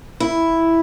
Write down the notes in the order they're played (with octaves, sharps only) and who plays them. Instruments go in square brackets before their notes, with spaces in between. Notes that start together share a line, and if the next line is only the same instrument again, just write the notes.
[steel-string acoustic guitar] E4